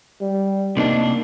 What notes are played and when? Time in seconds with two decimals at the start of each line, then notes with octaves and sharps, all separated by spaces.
0.21 G3
0.77 C3 A#3 D4 D#4